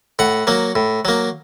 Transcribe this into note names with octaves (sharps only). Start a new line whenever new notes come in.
A2 F#5
F#3 A#3
A2
F#3 A#3